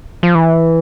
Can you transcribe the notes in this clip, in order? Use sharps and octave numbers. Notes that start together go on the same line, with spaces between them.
F3
E3